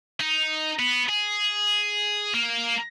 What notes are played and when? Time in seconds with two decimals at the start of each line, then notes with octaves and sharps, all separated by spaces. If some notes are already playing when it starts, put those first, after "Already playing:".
0.20 D#4
0.79 B3
1.09 G#4
2.34 A#3